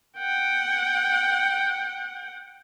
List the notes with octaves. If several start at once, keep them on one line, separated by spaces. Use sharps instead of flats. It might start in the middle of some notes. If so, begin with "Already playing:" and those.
F#5 G5